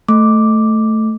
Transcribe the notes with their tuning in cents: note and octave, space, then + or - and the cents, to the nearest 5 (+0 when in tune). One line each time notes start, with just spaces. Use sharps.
A3 +0 D6 +0